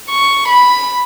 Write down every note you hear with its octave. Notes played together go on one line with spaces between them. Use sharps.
C#6
B5